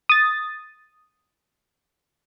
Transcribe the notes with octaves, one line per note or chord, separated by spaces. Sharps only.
D#6 A6